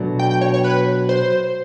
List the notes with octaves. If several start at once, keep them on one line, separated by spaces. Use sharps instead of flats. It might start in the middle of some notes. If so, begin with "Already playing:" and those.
Already playing: B2 F#3 A3 D4
G5
G5
C#5
C#5
B4
C5